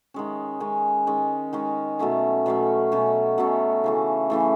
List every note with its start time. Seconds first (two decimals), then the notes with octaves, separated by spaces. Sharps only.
0.14 D#3 G#3 C#4
0.60 D#3 G#3 C#4
1.07 D#3 G#3 C#4
1.53 D#3 G#3 C#4
1.99 B2 F#3 A3 C#4
2.46 B2 F#3 A3 C#4
2.92 B2 F#3 A3 C#4
3.38 B2 F#3 A3 C#4
3.84 C#3 E3 A3
4.30 C#3 E3 A3